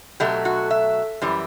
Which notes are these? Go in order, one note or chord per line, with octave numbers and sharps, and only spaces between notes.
B2 F#3 A3 G4
F#4
E5
F#2 E3 G3